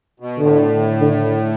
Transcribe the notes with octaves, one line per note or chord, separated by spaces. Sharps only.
B2
A2 D3
D3